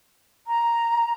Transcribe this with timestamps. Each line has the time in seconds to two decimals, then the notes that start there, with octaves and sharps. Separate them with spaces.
0.47 A#5